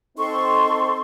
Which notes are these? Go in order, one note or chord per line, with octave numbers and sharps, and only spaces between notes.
C4 D#4 A4 C6 C#6